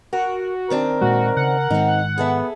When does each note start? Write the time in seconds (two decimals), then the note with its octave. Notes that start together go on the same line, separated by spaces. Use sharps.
0.13 F#4 A#4
0.70 D#3 C4 D4 A#4
1.01 A#2 G#3 F#4
1.37 C#3 F#5
1.70 G#2 D#3 G#3 C4 D#4
2.18 B3 G#4 A4 E5